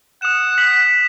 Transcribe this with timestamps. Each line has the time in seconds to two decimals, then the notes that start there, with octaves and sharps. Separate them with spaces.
0.22 F#5 D#6 E7
0.58 D#6 B6 F#7